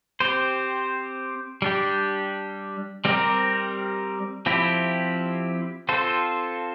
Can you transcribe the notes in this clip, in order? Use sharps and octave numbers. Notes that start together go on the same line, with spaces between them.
C4 G4 C5
G3 D4 G4
G3 C4 G4 A#4
F3 C4 E4 G4
C4 F4 A4 C5